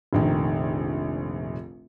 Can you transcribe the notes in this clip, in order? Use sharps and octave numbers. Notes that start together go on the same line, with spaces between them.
F1 A#1 D#3